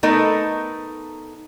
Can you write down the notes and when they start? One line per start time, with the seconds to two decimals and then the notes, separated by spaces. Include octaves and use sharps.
0.03 A3 B3 D#4 A4 A#4